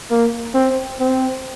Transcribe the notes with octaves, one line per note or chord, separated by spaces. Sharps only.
A#3
C4
C4